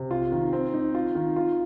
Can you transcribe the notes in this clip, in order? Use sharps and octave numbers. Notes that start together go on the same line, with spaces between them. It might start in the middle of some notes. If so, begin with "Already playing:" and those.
Already playing: C3
F4
D#3
C4
D#4
F4
D#3
F4